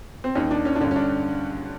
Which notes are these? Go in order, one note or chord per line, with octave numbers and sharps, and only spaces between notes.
C4
D#2 D#3 C#4
D4
C#4
D4
G2 D3 C#4
C#4
D4